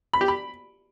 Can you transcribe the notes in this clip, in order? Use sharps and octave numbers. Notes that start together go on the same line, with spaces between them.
B5
G4
B5